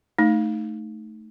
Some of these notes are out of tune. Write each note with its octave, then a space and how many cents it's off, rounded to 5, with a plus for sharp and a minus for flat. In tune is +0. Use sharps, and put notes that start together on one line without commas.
A3 +0 D#4 +0